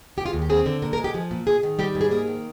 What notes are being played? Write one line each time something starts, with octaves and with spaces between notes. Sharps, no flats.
G#3 G4
F4
D#2
G4
C4 G#4
D3
A#2 A#4
A#4
G#3
G4
F3 G#4
A#2
G#2 G#4
D#3
G3 G4
G#2
G#4
A#3 G#4
D#3